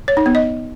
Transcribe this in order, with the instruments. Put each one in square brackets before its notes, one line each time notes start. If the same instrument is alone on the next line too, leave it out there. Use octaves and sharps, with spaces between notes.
[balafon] C#5
D#4
B3
D#5